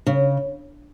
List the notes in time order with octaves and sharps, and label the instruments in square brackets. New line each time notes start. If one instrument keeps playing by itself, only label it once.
[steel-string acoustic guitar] C#3